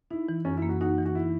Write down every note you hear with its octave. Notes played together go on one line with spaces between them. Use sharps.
D#4 E4
E3
F#2 C#4
E4
A#3
F#4
D#4 F#4
E3
F#4
E4